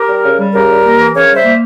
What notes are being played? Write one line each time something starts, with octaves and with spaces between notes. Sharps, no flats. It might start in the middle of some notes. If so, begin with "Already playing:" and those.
Already playing: G4 A#4
G3
C#3
G3
C#3 G4 A#4
G3
A#3
E3
C#3 A#4 C#5
G3
C5 E5
A#3